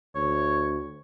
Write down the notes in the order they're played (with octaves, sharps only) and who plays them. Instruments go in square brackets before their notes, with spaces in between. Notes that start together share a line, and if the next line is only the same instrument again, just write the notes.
[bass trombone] D2 [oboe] C#5